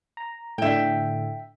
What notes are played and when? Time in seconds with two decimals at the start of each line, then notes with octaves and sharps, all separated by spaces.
0.17 A#5
0.58 A2 D3 E5 G5